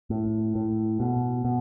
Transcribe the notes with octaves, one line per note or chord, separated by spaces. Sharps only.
A2
A2
B2
B2